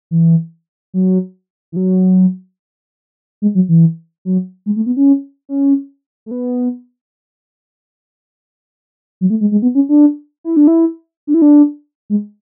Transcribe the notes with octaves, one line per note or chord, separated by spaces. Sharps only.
E3
F#3
E3
F#3
G#3
F#3
E3
F#3
G#3
A3
B3
C#4
C#4
A3
B3
F#3
A3
G#3
G#3
B3
C#4
D4
E4
D4
E4
D4
E4
D4
G#3